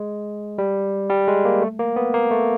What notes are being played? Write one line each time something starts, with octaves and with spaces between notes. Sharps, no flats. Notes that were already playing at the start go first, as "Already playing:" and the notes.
Already playing: G#3
G3
G3
G#3
A#3
A3
A#3
B3
A#3
A3